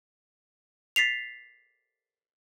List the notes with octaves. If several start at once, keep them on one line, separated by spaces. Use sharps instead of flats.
A6 B6 C7 F7